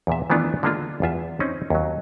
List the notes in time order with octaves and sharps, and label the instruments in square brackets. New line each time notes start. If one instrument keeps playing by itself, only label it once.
[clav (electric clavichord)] E2 A#2 E5
D#3 E3 A3 B3 D4 F4
D3 G#3 A#3 D4 F4
E2 F4 E5
C4 C#4 D#4
D#2 F#3